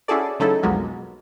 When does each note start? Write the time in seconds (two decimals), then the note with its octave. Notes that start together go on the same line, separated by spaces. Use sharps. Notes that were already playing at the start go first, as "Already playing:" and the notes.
0.08 C#4 E4 F#4 G#4 A4 D5
0.40 C#3 F#3 A3 D#4 E4 A4
0.63 B1 F2 F#3 G#3 A#3 B3